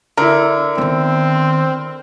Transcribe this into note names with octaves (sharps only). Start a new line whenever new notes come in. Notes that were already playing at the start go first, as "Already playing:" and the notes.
D3 E4 A#4
D#3 B3 C4